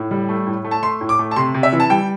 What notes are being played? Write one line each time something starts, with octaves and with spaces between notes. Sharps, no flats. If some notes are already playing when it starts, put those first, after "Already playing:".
Already playing: A2
G3
A3
A2
A3
A5
A3 C6
A2
D6
A3
A5
C3 C6
C3
E5
E3
A5
G3 G5